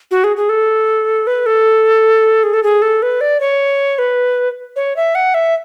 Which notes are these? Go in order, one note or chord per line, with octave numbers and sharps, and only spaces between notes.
F#4
G#4
G#4
A4
B4
A4
G#4
A4
G#4
A4
B4
D5
C#5
B4
C#5
E5
F#5
E5